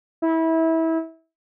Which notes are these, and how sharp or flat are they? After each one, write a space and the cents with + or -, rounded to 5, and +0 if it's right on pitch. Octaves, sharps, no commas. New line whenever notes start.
E4 -25